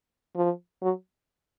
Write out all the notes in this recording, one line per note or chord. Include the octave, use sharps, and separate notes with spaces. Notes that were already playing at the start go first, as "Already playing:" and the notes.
F3
F#3